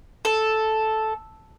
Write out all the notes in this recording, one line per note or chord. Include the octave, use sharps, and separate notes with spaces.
A4